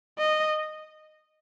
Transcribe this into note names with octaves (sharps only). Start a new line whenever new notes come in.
D#5